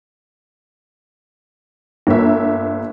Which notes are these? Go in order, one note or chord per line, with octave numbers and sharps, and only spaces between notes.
G1 A#3 E5